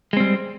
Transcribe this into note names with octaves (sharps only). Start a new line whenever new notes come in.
G3 G#3 C4